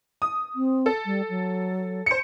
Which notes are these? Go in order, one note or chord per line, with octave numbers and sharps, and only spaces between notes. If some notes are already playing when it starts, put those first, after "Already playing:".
D#6
C4
A4
G3
F#3
C5 C#7